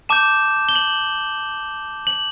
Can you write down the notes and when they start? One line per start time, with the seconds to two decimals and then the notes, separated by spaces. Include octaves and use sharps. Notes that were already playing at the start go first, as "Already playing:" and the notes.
0.09 A5 D6 G6 E7
0.69 G7
0.75 F#7
2.07 F#7